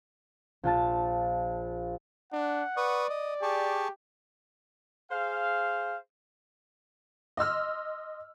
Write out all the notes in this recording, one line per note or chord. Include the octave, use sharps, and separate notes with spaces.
A#1 F4 A5 A6
D4 F#5
B4 D5 C#6 D#6
D#5
G4 G#4 A5 C#6
G#4 C5 F5
D#5 C6 E6 F6